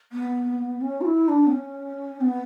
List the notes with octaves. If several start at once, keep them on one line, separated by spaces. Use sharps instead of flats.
B3
C#4
F#4
E4
D4
B3
C#4
B3